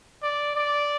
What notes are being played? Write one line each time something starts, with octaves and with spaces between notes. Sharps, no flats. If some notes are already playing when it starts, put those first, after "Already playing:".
D5
D5